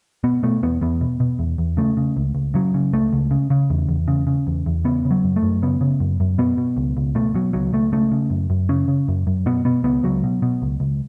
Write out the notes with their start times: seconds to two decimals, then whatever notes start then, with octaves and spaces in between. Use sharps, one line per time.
0.24 B2 B3
0.43 B2 A3
0.63 E2 B3
0.81 E2 B3
1.01 B2
1.20 B2
1.39 E2
1.58 E2
1.77 C#3 A3
1.97 C#3
2.17 C#2
2.35 C#2
2.54 C#3 F#3
2.74 C#3
2.93 C#2 A3
3.13 C#2
3.31 C#3
3.50 C#3
3.70 E2
3.89 E2
4.08 C#3
4.27 C#3
4.47 E2
4.66 E2
4.85 C#3 B3
5.05 C#3
5.11 F#3
5.24 F#2
5.36 A3
5.43 F#2
5.62 C#3 B3
5.81 C#3
6.00 F#2
6.20 F#2
6.38 B2 B3
6.58 B2
6.77 C#2
6.97 C#2
7.15 B2 A3
7.34 B2 F#3
7.53 C#2 F#3
7.73 C#2 A3
7.92 C#3 A3
8.12 C#3
8.30 F#2
8.50 F#2
8.69 C#3 C#4
8.88 C#3
9.08 F#2
9.27 F#2
9.46 B2 B3
9.65 B2 B3
9.84 C#2 B3
10.03 C#2 F#3
10.23 B2
10.42 B2
10.62 C#2
10.80 C#2